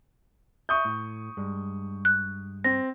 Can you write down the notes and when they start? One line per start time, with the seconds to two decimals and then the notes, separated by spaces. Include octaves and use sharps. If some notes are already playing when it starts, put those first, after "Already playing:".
0.69 E5 C#6 D#6 G6
0.85 A2
1.37 G2 G#3
2.05 F#6
2.64 C4 A#6